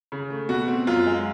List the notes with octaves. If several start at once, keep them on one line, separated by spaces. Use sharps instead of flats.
C#3
A3
B2 F#4
C4
F#2 F4
G#3